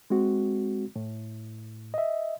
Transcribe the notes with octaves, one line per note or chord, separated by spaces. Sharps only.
G#3 C4 F#4
A2
D#5 E5